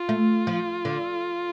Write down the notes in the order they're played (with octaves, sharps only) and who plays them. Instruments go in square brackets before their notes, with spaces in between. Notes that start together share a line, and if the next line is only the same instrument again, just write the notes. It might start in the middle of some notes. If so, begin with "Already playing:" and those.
Already playing: [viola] F4
[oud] A3
F3
D3